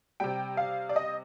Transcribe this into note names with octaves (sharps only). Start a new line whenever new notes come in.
C3 G3 G5
F5
D5
D#5